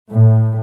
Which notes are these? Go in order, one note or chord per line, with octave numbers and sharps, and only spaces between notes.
A2